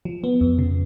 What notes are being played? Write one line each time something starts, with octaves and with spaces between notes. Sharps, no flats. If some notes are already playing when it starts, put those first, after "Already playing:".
F3
B3
F2
C#3